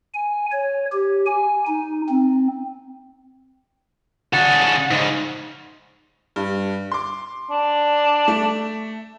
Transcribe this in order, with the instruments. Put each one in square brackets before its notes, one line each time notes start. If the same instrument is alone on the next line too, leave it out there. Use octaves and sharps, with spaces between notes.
[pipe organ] G#5
C#5
G4
G#5
D#4
C4
[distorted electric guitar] C#3 D4 [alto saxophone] F#5
[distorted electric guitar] G#2 C#3 [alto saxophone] D#4
[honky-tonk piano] G2
C6 D6
[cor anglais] D4
[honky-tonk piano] A3 E7